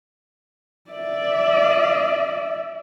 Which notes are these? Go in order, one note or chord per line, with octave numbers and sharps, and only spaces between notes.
D5 E5